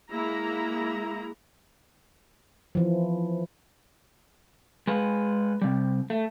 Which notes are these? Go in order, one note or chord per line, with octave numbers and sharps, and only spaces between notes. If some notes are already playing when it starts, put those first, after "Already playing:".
G#3 A#3 E4 A#5
E3 F3
G#3 B4
C3 G3
A3